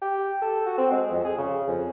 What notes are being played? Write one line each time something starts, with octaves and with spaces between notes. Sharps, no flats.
G4
A4
F#4
C4
G#3
F2
G#4
C#3
F2